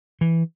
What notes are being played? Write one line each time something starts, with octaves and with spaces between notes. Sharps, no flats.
E3